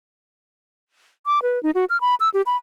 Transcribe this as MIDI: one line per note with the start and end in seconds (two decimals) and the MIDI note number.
1.26 1.39 86
1.43 1.61 71
1.63 1.71 63
1.75 1.85 66
1.90 2.00 89
2.01 2.15 83
2.20 2.29 88
2.34 2.42 67
2.46 2.56 83